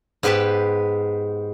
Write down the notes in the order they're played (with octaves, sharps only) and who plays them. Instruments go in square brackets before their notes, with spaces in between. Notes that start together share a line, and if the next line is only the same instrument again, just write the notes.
[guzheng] G#2 B3 G4 B4 G5 A5